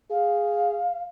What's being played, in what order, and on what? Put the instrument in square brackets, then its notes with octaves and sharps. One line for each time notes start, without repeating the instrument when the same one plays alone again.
[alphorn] G#4 [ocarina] F5